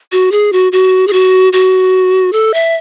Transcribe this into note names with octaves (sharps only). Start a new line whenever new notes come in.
F#4
G#4
F#4
F#4
G#4
F#4
F#4
A4
E5